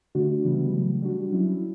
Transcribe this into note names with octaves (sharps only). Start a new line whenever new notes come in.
D3 A3 D4 F#4
C#3 E3 G3 B3
C#3 F#3 A3
G3 D4 F#4
F#3 C#4 E4